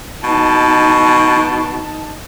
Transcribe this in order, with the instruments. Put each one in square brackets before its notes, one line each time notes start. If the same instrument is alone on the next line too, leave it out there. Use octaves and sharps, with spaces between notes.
[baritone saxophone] B2 [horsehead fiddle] D#4 A5